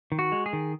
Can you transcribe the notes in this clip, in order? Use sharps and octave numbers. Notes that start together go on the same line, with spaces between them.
D#3
F#4
G#3
G#4
D#3